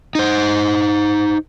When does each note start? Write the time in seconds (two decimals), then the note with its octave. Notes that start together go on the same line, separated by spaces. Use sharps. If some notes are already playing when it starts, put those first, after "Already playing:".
0.15 D#4 C5